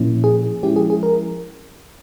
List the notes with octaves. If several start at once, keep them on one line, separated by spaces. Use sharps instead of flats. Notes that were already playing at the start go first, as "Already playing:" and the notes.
Already playing: A#2 F3 A#3 C#4 E4
G#4
F3 G#3 C#4 E4 G4
G#4
G#4
A#4